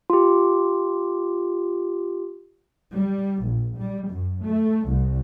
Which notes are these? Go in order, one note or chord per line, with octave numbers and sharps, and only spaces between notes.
F4 G4
G3
A#1
G3
F#2
A3
C2